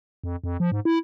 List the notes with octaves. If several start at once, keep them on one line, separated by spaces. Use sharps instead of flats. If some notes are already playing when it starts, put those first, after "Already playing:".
F2
F2
F3
G#2
E4